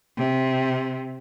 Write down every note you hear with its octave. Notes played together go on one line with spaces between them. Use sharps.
C3